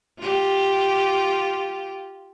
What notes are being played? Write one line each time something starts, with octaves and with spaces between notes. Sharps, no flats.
F4 G4